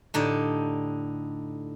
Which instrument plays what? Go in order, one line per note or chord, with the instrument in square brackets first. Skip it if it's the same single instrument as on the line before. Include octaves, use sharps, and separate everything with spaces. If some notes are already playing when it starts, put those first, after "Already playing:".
[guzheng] A2 D3 D#4 G4